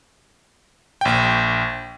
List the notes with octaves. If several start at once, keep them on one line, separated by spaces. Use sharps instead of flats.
A#1 G5